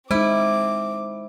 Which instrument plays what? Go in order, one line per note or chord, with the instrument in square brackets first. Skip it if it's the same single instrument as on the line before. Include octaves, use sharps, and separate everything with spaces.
[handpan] G#3 D#4 [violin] C4 D6 [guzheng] E4 [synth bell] C5